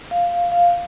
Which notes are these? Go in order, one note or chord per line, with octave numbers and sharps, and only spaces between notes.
F5
F5